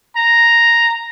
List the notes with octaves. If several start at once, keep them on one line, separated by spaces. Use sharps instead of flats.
A#5